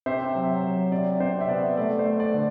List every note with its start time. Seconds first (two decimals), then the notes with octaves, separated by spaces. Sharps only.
0.06 C3 C5 E5
0.35 F#3
0.64 F#3
0.92 C3 D5
1.20 C3 C5
1.41 E5
1.48 B3 D5
1.77 A3 D5
1.99 C5
2.06 A3
2.20 D5
2.34 D3